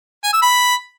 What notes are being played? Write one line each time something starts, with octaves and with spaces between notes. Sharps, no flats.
G#5
E6
B5